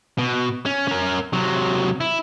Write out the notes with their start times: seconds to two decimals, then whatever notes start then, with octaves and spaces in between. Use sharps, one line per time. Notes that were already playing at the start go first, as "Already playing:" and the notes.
0.19 B2
0.66 C#4
0.88 C#4 A#4
1.33 C3 F#3
2.01 E4